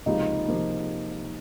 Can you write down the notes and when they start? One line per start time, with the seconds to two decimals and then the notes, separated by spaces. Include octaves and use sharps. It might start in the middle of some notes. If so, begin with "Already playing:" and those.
0.06 C#2 C3 F3 A#3 D#4 F4
0.48 C3 F3 A#3